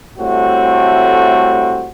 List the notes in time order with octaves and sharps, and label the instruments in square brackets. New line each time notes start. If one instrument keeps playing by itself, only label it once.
[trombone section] A2 G3 A3 C4 F#4